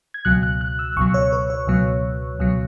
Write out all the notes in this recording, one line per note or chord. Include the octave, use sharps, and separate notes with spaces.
G#6
C#2 B2 F#3 F#6
F#6
F#6
E6
C#2 B2 F#3 C#6
C#5
B4
C#5
C#2 B2 F#3
C#2 B2 F#3